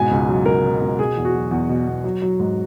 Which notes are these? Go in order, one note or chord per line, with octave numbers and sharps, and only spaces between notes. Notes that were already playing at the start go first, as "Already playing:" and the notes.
Already playing: G#2 B2 G#5
C#2
F#3
C#2 A#4
B2
C#2
B2 G#4
E2
F#4
F#3
E2
B2
E2
F#3
F#3
G#2